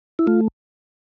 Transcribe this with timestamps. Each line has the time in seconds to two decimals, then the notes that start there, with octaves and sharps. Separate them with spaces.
0.19 E4
0.27 A3 F4